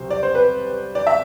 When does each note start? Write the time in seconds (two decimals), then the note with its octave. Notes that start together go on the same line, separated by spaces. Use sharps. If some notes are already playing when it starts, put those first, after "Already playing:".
Already playing: C2 C3 F#3 C5
0.10 D5
0.23 C5
0.35 B4
0.95 D5
1.07 E5